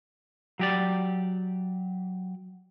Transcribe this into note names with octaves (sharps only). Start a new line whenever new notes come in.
F#3 G4 D5